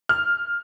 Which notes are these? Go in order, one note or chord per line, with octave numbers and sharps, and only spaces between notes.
F6